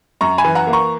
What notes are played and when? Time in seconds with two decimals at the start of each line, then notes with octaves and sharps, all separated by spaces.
0.21 F#2 A#5 C#6
0.38 G#5 B5
0.45 E3
0.55 F#5 A#5
0.67 A#3
0.73 A#5 C#6